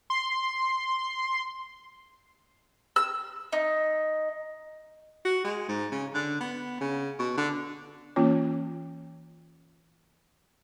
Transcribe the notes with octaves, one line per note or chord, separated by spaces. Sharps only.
C6
E6
D#4
F#4
G#3
G#2
C#3
D3
B3
C#3
B2
D3
E3 A#3 C#4 F4 C#5